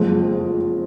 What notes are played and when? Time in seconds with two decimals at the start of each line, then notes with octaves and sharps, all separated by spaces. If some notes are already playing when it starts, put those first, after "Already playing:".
Already playing: F#1 F2 F3 G#3